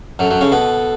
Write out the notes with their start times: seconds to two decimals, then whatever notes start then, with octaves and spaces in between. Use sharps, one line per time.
0.19 F#2 F#3 A4
0.30 F#2 F#3
0.41 C#3 C#4
0.52 B2 B3